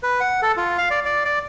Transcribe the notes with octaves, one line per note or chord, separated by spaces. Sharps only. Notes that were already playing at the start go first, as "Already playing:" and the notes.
B4
F#5
A4
F4
F5
D5
D5
D5